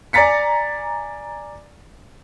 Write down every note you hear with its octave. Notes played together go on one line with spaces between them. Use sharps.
D5 G#5 A#5 A6 B6 C#7